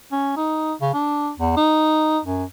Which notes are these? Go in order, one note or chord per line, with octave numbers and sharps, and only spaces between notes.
C#4
D#4
C#3
D4
E2
D#4
F#2